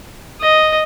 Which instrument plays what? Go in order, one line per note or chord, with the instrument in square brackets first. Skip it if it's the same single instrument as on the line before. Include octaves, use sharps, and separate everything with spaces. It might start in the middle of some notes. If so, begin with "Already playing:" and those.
[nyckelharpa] D#5